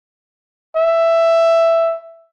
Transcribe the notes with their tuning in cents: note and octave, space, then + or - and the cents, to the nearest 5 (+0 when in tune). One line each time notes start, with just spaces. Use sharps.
E5 +10